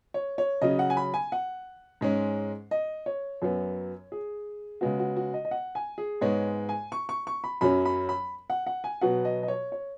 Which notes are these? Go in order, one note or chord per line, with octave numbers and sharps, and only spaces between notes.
C#5
C#5
C#3 F#3 C#4 D#5
F#5
G#5
B5
G#5
F#5
G#2 G#3 C#4
D#5
C#5
F#2 F#3 B3
G#4
C#3 G#3 B3 F#4
F#4
F#4
D#5
D#5
F#5
G#5
G#4
G#2 G#3 B3 C#5
G#5
C#6
C#6
C#6
B5
F#2 F#3 C#4 B5
B5
B5
F#5
F#5
G#5
B2 F#3 B3 F#5
D#5
D#5
C#5
C#5